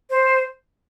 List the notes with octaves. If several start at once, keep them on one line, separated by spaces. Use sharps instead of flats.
C5